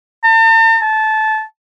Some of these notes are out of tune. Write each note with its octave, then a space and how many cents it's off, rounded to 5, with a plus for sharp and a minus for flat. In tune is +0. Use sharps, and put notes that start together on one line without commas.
A5 +45
A5 -15